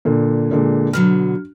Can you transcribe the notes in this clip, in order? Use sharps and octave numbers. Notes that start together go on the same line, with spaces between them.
A#2 D3
A#2 D3 G#3
B2 D3 F#3 F6